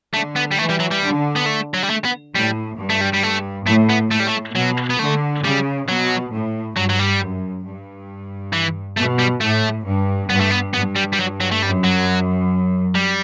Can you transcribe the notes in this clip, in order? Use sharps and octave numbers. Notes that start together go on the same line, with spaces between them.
D3 A3
B3
G3
E3 A3
G3
F#3
G3
D3
B3
A3
F#3
G3
A3
B3
A2 G3
G2
A3
G3
G3
A3
A2 A3
B3
A2 A3
G3
A3
B2 F#3
B3
D3 A3
C#3 G3
B2 F#3
A2
G2 F#3
F#3
G3
F#2
G2
E3
B2 A3
G3
A2 A3
G2
G2 B3
A3
B3
G2 B3
G3
G3
F#3
F#3
A3
F#2 G3
F#3
G3